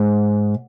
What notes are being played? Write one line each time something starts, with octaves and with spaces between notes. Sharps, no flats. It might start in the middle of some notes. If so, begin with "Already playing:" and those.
Already playing: G#2